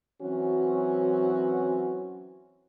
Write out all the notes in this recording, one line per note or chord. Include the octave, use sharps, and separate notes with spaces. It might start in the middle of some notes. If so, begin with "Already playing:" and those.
E3 F#3 C4 C#4 F#4